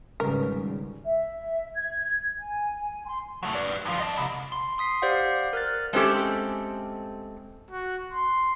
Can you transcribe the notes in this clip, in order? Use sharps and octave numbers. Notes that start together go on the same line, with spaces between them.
G#1 C#3 G3 C#4 A#4 B4
E5
G#6
G#5
C6
F#3 A3
B4 D5
G2 F3
D#5 A5
C2
C6
C6 D#6 B6 C7
G4 C5 D5 F5 F#5
A#4 F6 F#6 A6
G#3 A3 C4 C#4 G4 A4
F#4
C6